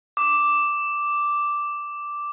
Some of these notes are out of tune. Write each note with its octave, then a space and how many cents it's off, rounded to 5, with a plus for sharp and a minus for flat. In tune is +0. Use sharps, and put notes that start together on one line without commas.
D6 +0